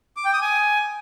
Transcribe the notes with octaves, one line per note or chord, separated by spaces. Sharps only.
D6
G5
D#6
G#5